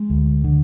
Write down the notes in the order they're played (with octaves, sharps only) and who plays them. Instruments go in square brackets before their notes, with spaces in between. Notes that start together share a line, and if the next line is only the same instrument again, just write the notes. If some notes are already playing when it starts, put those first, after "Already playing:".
Already playing: [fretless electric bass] G#3
D2
D3